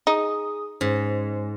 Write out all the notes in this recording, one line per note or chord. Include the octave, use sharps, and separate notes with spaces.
D#4 G#4 D#6
G#2 C#4